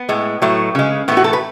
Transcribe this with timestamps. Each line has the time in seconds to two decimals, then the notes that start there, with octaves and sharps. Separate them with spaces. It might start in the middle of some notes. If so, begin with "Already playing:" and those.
Already playing: B3
0.09 A2 G#3
0.42 A2 F#3 A3
0.75 C#3 G#3
1.08 A2 E3 A3 B3
1.17 F#4
1.24 A4
1.33 B4